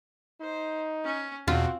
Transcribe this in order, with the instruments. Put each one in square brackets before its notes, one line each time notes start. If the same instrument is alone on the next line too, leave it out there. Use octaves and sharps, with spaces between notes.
[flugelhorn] D#4 [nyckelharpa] C5
[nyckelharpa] C#4
[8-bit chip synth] E2 B2 [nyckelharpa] C4 [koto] F4 [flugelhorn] F#4